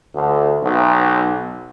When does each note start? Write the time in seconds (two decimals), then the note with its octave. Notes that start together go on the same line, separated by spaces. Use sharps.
0.15 D2
0.63 B1